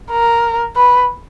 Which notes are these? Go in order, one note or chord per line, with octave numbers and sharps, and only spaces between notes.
A#4
B4